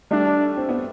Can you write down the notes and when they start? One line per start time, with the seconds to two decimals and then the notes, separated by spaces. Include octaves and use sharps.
0.11 G3 A3 D4
0.57 C4
0.69 B3